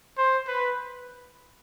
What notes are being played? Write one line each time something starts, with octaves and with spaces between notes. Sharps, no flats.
C5
B4